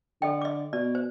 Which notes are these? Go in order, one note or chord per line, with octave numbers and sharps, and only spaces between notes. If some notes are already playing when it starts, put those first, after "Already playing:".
D3 A4 D#5 G5
D#5 D6
B2 D5
C5